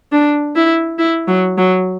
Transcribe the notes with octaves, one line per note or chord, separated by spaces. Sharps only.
D4
E4
E4
F#3
F#3